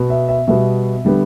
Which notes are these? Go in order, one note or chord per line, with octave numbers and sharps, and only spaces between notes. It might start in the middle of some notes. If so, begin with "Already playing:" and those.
Already playing: B2 B3
E5
E5
B2 G3 B3 E5
D3 G3 B3